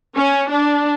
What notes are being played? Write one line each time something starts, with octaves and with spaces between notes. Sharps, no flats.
C#4
D4